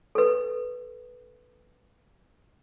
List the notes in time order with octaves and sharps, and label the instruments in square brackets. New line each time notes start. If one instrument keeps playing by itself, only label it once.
[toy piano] A4 B4